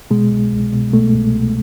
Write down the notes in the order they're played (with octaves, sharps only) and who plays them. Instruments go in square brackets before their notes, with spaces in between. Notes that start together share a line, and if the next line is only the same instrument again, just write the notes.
[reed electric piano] B2 G#3
C2
C2
B2
B2 A3
C2
C2